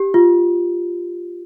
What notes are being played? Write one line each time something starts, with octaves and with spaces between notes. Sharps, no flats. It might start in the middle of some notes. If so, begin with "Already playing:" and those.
Already playing: G4
F4